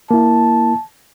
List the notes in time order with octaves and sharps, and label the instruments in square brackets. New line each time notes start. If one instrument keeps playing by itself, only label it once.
[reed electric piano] A#3 E4 [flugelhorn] A5